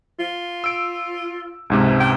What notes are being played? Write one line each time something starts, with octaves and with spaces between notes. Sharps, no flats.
F4
E6 D7
C#2 G#2 C3
G5